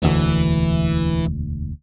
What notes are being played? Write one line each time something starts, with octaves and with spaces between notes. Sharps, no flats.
E1 D2 E3